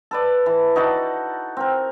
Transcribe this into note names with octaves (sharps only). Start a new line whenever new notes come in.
A4 B4 D5
E3
D#4 F#4 A4 D5
C4 A#4